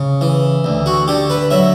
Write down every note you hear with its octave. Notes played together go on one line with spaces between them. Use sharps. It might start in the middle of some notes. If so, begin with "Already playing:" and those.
Already playing: C#3
E3
D2
F#4
D3 G4
B4
F#3 E5